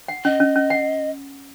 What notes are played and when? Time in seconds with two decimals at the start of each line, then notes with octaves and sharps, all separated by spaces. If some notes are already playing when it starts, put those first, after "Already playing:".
0.08 F#5
0.24 C#4 D#5
0.40 C#4
0.56 C#4
0.70 F#5